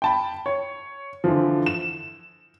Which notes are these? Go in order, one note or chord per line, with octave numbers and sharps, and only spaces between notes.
G5 A5 B5
C#5
D3 E3 F3
E7